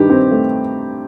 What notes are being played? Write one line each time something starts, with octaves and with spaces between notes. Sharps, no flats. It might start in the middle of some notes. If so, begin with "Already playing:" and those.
Already playing: G2 D#3 G4
C4
A3